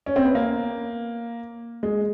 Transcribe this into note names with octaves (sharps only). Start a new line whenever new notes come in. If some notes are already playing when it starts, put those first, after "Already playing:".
C#4
C4
B3
A#3
G#3